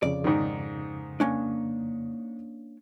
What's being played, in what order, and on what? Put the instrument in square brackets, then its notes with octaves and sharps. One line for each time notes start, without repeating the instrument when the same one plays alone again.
[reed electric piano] F2 C#3 [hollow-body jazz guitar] D5
[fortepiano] G#2 D#3
[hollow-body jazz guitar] A#3 C#4 D4